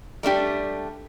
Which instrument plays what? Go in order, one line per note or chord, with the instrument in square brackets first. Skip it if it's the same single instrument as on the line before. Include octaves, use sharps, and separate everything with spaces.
[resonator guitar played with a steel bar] G3 A3 D4 G4